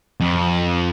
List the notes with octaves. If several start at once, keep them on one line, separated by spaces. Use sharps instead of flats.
F2